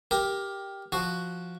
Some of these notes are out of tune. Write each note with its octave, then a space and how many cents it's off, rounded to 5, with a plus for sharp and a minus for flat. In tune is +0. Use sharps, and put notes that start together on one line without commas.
G4 +0 A#4 +10
F3 +0 F#4 +0